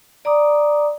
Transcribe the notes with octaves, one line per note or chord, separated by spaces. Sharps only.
D5 A#5 D6 D#6